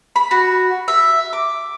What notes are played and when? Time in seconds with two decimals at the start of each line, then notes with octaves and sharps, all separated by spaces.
0.16 B5
0.31 F#4
0.88 E5
1.33 D6